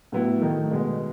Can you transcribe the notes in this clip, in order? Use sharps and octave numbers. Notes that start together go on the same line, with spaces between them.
A2 F#3 B3 E4
D#3 A3 D#4
B2 G#3 B3